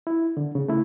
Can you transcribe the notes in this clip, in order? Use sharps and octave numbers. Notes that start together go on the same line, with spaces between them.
E4
D3
C#3
A3 E4